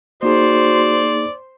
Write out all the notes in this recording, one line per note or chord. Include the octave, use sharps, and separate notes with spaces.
A#3 D#4 F#4 G#4 C5 D5